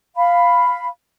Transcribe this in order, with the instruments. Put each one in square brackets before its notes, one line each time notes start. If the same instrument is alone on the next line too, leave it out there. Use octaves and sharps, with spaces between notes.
[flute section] F5 B5